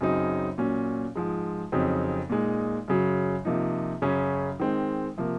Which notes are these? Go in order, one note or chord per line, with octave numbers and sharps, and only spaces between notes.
F#2 C#3 F#3 C4 D#4
A#2 F#3 C#4
G#2 F3 G#3
F2 C#3 F#3 C4 D#4
A#2 G#3 D#4
F#2 C#3 F#3
C3 F3 A#3 D#4
F#2 C#3 F#3 C#4
D#3 G#3 C4
C3 F3 A#3